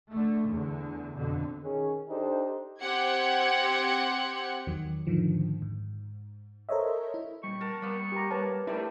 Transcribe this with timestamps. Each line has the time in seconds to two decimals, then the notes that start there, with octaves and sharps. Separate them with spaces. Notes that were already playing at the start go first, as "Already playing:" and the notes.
0.12 D3 A3
0.49 E2 D3
1.17 F2 B2 D3
1.62 D#3 C#4 G#4
2.09 D4 D#4 G4 A4 C5
2.80 C4 G4 F#5 G#6 C#7
4.67 E2 D#3 F#3
5.07 G#2 D3 D#3 F3
5.62 G#2
6.69 A4 A#4 C5 C#5 D#5 E5
7.14 E4
7.44 A#2 G3 C#6
7.61 A#4 F#5 A5
7.82 G3 A#3 B3
8.12 G4 A#5
8.31 A#4 B4 C#5 A5
8.67 G3 A3 D4 E4 A#4